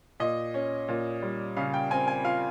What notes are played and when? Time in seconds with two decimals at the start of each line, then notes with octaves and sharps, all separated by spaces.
0.20 A#2 D#5
0.54 C#4
0.88 A#2
1.23 G3
1.57 C#3 F5
1.74 G5
1.91 C4 G#5
2.08 G#5
2.25 F4 F5